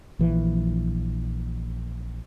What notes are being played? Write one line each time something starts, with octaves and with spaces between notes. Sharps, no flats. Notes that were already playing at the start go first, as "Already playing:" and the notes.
A#1 E3 F3